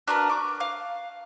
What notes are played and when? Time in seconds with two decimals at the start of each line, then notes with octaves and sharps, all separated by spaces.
0.08 D4 F#4 A#4 B4
0.29 C#6 D6
0.60 F5